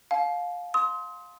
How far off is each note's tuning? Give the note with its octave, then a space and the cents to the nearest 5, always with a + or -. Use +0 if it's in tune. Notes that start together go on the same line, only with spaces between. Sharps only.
F5 +20 A5 -40
C6 +0 D#6 +40